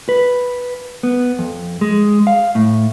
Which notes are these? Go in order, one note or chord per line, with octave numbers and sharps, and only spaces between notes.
B4
B3
F2
G#3
F5
A2